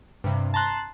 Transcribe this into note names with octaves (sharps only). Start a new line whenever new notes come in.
G2 C3
A5 A#5 C6 F#6